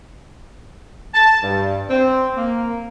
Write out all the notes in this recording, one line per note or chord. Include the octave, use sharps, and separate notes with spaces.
A5
G2
C4
A#3